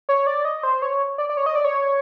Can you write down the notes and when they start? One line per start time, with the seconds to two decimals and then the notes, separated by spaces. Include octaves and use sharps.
0.09 C#5
0.27 D5
0.45 D#5
0.63 C5
0.82 C#5
1.18 D5
1.29 D5
1.37 C#5
1.46 D#5
1.55 D5
1.64 C#5